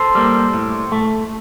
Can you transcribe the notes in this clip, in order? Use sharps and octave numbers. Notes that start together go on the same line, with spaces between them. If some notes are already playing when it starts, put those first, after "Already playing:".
Already playing: A4 C5
G3 A#3
A2
A3